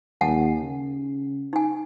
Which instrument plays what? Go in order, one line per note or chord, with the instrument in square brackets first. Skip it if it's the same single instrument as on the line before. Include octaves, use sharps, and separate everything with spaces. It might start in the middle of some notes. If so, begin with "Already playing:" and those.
[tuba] D#2 [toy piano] F#5 G#5 A5
[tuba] C#3
[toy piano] D#4 G#5